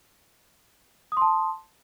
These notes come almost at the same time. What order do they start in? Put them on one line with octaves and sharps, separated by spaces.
D#6 C6 A5